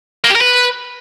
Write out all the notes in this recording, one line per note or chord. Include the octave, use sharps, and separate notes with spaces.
A#3
G4
A#4
B4